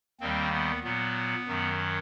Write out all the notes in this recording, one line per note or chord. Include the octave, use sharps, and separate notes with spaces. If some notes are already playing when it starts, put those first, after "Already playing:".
D#2 D#3 G3 A#3 C4
B3
A#2 F#3 B3
F#2 D#3 F#3